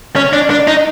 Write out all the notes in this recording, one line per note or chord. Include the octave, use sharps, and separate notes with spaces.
C#4
D4
D4
D#4